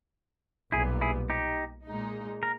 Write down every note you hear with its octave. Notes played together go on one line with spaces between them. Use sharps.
B1 A#2 G3 B3 E4 G#4
E4 G#4
D#4 G4
A#2 G#3 D#4
A#4